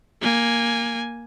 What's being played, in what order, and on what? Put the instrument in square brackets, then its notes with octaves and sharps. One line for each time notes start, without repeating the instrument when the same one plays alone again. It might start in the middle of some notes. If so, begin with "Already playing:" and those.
[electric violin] A#3 G#5